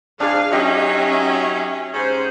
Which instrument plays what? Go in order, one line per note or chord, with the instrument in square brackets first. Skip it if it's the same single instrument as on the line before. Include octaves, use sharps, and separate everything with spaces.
[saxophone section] F2 G#2 [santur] D4 [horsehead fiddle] G#4 [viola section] F5
[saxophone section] F#3 D#4 [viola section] C#4 [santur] G4 D#5 [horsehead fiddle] E5
[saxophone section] G#2 C#4 [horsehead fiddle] G#4 C5